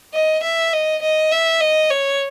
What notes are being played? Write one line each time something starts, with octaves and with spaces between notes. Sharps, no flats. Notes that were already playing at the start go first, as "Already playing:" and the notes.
D#5
E5
D#5
D#5
E5
D#5
C#5